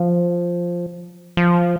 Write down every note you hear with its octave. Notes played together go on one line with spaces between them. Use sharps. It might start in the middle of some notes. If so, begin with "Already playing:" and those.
Already playing: F3
F3